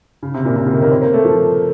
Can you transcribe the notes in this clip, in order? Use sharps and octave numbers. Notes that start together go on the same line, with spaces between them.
C#3
C3
A#2
C3
C#3
D#3
A#3
C4
A#3
A3
F3